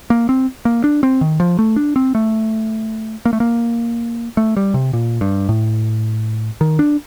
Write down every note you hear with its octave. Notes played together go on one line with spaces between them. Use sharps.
A#3
C4
A#3
D4
C4
D#3
F3
A3
D4
C4
A3
A#3
A3
A#3
A3
G3
C3
A#2
G2
A2
D#3
D4